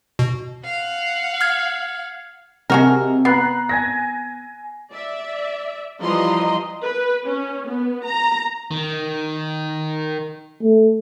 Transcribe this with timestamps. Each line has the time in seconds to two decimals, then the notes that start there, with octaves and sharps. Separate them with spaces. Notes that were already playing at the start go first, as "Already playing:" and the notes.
0.19 B2
0.65 F5 F#5
1.41 F6 G#6
2.70 C3 G#3 F#4 A#4
3.25 B3 A#5 F#6 C7
3.69 G#5 G#6 A#6
4.91 D5 E5
5.99 E3 F3 G3 D#5 A#5 C6
6.83 B4
7.24 C#4
7.65 B3
8.05 A#5
8.71 D#3
10.62 A3